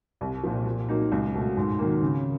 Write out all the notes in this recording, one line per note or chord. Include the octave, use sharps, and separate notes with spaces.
C2
A#2 F3
A#2
F#3 A#3 D#4
C#2
B2 F#3 A3
G#2
D#3 F#3 A#3
C#3